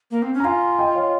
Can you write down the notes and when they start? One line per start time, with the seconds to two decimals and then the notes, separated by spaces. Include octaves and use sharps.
0.11 A#3
0.22 C4
0.34 C#4
0.40 A#5
0.44 F4 F5 G#5
0.79 D#5 G5
0.95 C#5 F5